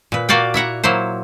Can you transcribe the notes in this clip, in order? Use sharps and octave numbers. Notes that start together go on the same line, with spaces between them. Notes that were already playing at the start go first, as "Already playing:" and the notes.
A#2 B4
A#3 F#4 D5 F5 G5
E4 E5 F#5 A#5
F#3 A#3 E4 C5